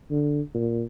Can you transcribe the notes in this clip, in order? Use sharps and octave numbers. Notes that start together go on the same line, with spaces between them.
D3
A#2